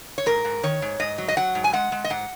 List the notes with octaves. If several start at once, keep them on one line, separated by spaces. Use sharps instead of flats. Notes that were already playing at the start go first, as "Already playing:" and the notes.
C#5
G#2 A#4
G#2
D#3 C#5
G#2
G#2 D#5
F#3
D#5
F#3 F#5
G#2
G#5
G#3 F#5
G#3
D#5
G#2 F#5